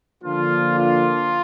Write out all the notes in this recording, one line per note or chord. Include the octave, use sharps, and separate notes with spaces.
D3 F3 A#3 D4 F4
F4